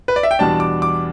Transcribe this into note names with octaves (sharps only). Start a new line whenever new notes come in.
B4
D5
E5
G5
E2 B2 G3 D4 A5
D6
D6